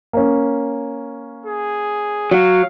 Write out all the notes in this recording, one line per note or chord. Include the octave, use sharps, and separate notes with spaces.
A#3 C#4
G#4
F#3 F5